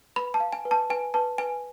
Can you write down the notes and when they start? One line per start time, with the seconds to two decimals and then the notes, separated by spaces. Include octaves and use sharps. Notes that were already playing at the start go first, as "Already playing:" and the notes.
0.16 B4 B5
0.34 A5
0.40 F5
0.53 G#5
0.65 B4
0.71 A5
0.90 B4 G#5
1.14 B4 A5
1.38 B4 G#5